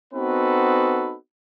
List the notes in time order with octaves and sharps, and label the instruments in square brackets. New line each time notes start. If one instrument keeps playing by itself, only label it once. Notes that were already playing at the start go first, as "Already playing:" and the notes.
[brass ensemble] B3 C4 D#4 F#4 A4 B4